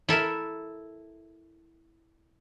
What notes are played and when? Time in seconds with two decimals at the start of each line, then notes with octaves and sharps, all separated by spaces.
0.09 E4 A4 A#4 E5